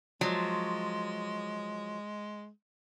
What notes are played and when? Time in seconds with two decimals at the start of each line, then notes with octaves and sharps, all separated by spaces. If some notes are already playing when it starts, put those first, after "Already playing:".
0.21 F3 F#3 G#3